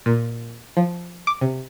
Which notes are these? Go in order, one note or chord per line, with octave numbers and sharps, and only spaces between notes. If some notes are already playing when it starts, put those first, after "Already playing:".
A#2
F3
D6
C3